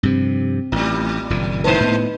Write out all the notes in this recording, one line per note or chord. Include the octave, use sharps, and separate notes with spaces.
G2 C3 F3 C4
A1 A2 G3
F#1 A#2 D#3
G#2 D#4 B4 C5
A2 B3